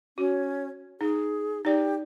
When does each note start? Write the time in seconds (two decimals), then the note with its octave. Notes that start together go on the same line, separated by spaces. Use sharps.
0.18 C#4 F#4
1.01 D#4 G#4
1.65 D#4 G4 D5